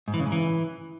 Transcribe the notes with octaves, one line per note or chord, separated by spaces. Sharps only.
G#2
E3
C#3
G#2
E3